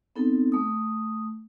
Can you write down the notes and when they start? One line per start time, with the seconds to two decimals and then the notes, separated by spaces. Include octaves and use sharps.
0.16 B3 C4 D#4 A4
0.52 A3 D#6